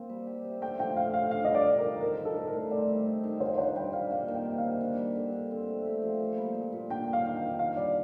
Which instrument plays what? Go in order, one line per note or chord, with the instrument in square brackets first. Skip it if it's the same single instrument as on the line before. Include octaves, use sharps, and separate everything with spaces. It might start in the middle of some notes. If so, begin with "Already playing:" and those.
Already playing: [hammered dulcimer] A#3 C4
G3
G4
C3
[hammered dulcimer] A3 [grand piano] G5
[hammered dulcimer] F3 [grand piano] G5
[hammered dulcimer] D3 [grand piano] F5
[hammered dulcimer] D3 [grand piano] F5
[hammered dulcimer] D4 [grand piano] F5
[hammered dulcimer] G3 [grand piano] D#5
[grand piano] D5
[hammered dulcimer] F4
[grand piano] A#4
[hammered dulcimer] D#3
[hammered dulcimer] C4 [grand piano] A#4
[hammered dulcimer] G3
[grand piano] A4
[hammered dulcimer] A2
[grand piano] A#4
[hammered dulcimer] A2
[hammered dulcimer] C4 [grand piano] D5
[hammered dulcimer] G3
D#4
D#3
[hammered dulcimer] F4 [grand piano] C5
[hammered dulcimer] D4 [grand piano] C5
[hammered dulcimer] G3 [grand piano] G5
[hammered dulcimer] G3 [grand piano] F5
[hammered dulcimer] A#3 [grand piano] F5
[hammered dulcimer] D#3
[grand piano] G5
[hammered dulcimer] C3
[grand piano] F5
[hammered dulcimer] C3
D4
G3
D3
D3
C4
A3
G4
F3
A#3
G3
A#2
A#2
[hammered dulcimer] D4 [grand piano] G5
[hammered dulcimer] A#3
[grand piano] F5
[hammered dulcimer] D#3
[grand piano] G5
[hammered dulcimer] D#3
[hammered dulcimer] D4 [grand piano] F5
[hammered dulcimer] G3 [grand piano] D5